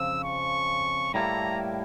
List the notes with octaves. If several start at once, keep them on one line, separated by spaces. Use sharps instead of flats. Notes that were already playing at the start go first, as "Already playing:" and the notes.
Already playing: F2 C#3 F3 E6
C#6
A2 G3 A#3 E4 A4 A#5